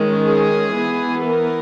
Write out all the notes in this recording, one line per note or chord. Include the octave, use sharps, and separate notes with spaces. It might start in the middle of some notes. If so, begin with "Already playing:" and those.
Already playing: D#3 G#3 C#4
G#4
E3 B3
A#4